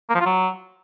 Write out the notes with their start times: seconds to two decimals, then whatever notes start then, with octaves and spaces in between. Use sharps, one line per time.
0.10 A#3
0.15 F3
0.20 F4
0.26 F#3